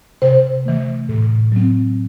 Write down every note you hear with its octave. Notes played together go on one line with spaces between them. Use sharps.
C3 C5
E3 A3
A2
F#3 C4